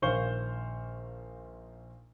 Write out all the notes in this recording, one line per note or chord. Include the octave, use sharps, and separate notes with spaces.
A#1 D#3 C5 F5 C#6 G7